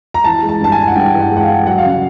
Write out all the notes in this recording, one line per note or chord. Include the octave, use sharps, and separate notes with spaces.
A#5
E3 A5
G#3
A5
G2 A5
G#5
E3
F#5
G2 G5
E3
F#5
G#3
F#5
F5
E3
F#3 F#5
F5
C#3
F#5